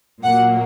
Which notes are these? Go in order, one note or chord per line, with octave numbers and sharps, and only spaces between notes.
A#2 F#3 A#3 F#5